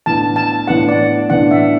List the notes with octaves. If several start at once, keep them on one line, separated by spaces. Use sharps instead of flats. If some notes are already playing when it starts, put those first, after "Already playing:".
A2 E3 B3 D4 A5
A5
A2 E3 B3 D4 F#5
D5
A2 E3 B3 D4 F#5
E5